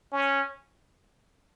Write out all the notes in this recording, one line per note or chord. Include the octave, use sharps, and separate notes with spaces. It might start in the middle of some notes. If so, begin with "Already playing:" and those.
C#4